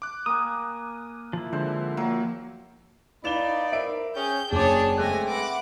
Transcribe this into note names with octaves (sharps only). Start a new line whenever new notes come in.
D6 F#6
A#3 G#5 D#6
F3 E4
D3 G#3 C5
F#3 A#3
D#4 E4 B4 D5 F5 B5 E7 G7
A#4 C5 E5 D7
C#4 G#4 G5 G6
F#1 D4 G#4 C#5 D6
G#3 A3 C4 G#5 F#6 A#6
B4 E5 F#5 B5 D6